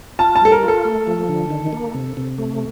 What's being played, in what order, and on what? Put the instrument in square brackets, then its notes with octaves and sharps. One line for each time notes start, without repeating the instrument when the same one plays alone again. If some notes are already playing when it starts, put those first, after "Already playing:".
[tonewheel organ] F4 [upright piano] A5
[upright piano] A5
[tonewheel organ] G3 [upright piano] A4
[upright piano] A#4
[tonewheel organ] F4
[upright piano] A4
[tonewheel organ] A3
F3
D3
D#3
A#3
C3
C3
A3